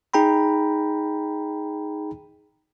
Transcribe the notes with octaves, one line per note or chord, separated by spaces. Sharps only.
D#4 G#4 G5 A#5 B5